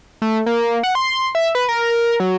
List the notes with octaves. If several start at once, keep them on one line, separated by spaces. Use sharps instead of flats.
A3
A#3
F#5
C6
E5
B4
A#4
F#3